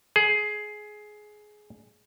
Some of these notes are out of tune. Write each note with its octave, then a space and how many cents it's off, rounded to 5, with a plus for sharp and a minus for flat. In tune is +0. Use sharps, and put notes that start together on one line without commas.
G#4 +15